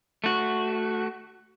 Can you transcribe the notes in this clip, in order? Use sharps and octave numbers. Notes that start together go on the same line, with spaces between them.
A3 F#4